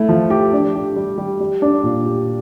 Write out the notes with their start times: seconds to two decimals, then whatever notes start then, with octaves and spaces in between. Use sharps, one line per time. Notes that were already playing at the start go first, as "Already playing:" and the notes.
Already playing: A3 E4
0.09 F3
0.30 G4
0.53 D4
0.75 G4
0.96 G3
1.18 G3
1.40 G3
1.62 D4
1.83 A#2
2.05 G4